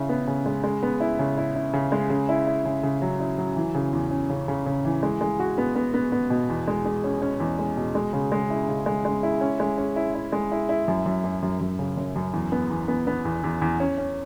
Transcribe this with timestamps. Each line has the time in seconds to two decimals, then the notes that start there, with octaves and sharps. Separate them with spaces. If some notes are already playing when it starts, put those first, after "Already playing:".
Already playing: C#3 E4
0.09 B3
0.27 C#3
0.46 G#3
0.64 G#3
0.83 B3
1.00 E4
1.19 C#3
1.37 E4
1.55 E4
1.73 C#3
1.92 G#3
2.10 C#3
2.29 E4
2.47 E4
2.65 C#3
2.83 C#3
3.02 F#3
3.20 E4
3.38 F#3
3.56 E3
3.75 C#3
3.93 E2
4.11 C#4
4.30 C#3
4.48 C#3
4.66 C#3
4.85 E3
5.03 G#3
5.21 G#3
5.39 F#4
5.58 B3
5.76 B3
5.94 B3
6.12 B3
6.30 B2
6.49 E2
6.68 G#3
6.85 G#3
7.04 C#4
7.22 C#4
7.40 E2
7.59 G#3
7.77 B2
7.95 G#3
8.13 C#3
8.32 G#3
8.50 E4
8.68 C#3
8.86 G#3
9.05 G#3
9.23 E4
9.41 C#4
9.60 G#3
9.78 C#4
9.96 E4
10.15 E4
10.32 G#3
10.52 E4
10.69 E4
10.88 F#2
11.06 F#2
11.24 F#2
11.42 F#2
11.61 F#2
11.79 C#3
11.97 F#2
12.15 F#2
12.33 E2
12.52 B3
12.70 E2
12.88 B3
13.07 B3
13.25 E2
13.44 E2
13.61 E2
13.80 C#4
13.98 C#4